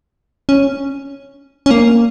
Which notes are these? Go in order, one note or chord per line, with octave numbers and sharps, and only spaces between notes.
C#4
C#4
A#3